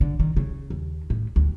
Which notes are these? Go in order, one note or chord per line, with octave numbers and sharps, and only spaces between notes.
D3
D#3
C#3
D#2
A2
D2